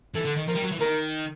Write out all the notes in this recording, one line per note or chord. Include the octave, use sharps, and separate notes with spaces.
E3 A4
D3
D#3
F3 A#4
G3
F#3
E3
D#3 A#4